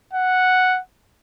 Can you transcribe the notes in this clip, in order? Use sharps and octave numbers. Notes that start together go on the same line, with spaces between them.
F#5